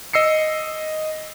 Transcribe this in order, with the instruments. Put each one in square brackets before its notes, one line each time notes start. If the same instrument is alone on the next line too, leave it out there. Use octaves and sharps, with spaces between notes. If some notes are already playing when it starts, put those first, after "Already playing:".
[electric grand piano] D#5 E6 C7 C#7